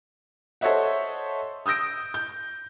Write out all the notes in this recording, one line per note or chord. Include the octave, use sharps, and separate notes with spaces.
A4 C5 C#5 D#5 E5 F#5
D#6 E6 G6 A#6 D7
G6